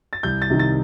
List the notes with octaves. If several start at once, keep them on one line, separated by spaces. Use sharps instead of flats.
A6
C2 G6
A6
C3 D#3
A6